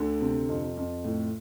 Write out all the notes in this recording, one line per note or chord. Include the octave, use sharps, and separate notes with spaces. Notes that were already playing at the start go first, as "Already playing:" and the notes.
Already playing: D2 D3
C3
F2
F2
A2